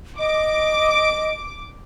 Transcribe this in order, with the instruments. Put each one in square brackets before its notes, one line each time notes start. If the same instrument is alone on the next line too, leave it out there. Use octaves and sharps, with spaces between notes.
[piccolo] D#5 [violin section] D6